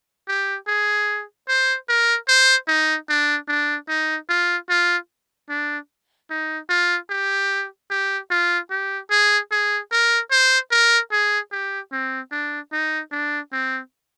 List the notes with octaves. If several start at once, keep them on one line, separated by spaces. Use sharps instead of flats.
G4
G#4
C5
A#4
C5
D#4
D4
D4
D#4
F4
F4
D4
D#4
F4
G4
G4
F4
G4
G#4
G#4
A#4
C5
A#4
G#4
G4
C4
D4
D#4
D4
C4